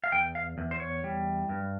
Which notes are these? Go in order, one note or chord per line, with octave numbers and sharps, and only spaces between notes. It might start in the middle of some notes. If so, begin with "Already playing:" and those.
F5
E2 G5
F5
E2
C5
C#5
G3
G2